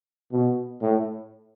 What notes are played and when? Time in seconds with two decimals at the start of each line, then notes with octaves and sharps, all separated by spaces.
0.32 B2
0.82 A2